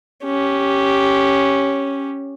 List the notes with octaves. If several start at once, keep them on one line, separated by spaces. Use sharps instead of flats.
C#4 G4